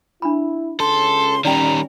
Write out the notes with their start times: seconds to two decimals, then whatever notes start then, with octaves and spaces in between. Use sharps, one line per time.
0.22 D4 E4 B5
0.80 C#2 C#3 C#4 A4 C6
1.45 D#3 G3 C#4 D5 G5 A#5